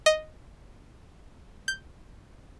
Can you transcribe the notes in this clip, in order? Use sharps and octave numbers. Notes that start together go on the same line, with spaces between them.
D#5
G6